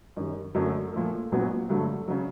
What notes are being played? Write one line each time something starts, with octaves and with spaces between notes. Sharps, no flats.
F#2 D#3 G3
F#2 D3 F#3 A3
A#2 F3 A3
A#1 A#2 F#3 B3
G2 D3 F#3 A3
C#3 F#3